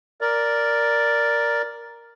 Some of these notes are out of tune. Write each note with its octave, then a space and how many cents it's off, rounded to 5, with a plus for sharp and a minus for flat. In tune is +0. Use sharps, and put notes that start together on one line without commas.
A#4 +0 D5 -5